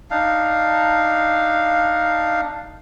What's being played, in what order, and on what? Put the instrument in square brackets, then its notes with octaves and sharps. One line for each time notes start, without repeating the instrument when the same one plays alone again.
[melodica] D4 D#4 F5